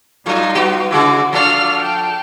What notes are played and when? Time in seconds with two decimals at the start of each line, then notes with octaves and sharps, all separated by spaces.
0.26 A2 F3 G3 A3 D#4 F4
0.55 B3 F#4 G4
0.91 C#3 G#3 E4 F#4 D6
1.33 F3 A3 D4 A4 F5 F6
1.78 G5 A5